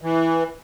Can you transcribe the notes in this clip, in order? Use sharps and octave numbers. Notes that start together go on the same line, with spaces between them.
E3